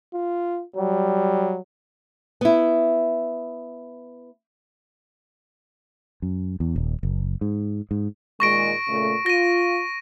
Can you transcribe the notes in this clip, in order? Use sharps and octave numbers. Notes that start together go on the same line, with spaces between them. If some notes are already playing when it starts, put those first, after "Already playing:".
F4
F#3 G3
B3 E4
F#2
E2
D#1
F#1
G#2
G#2
A#2 D#3 G#3 C#6 A#6 D7
A#2 C#3 A3
F4 A#6 D#7